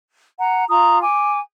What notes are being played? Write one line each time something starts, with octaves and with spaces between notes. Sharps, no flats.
F#5 A#5
F4 A#5 D#6
G#5 D6